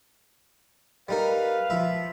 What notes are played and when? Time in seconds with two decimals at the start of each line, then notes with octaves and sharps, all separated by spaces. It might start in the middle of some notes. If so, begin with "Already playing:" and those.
1.08 G3 D#4 A#4 B4 F5
1.70 F3 E5 B5